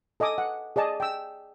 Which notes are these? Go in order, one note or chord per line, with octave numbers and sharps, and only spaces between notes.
A4 D#5 G#5 D6 D#6
F#5
G#4 D5 D#5 A5
G5 E6